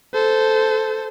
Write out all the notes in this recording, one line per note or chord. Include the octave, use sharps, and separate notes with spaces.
A4 C5